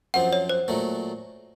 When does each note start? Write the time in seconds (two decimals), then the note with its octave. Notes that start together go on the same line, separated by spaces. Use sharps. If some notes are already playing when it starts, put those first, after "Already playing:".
0.14 F#2 F3 C4 F#5
0.33 C#5
0.49 C5
0.68 A#2 F#3 A3